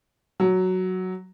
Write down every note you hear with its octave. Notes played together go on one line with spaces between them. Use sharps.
F#3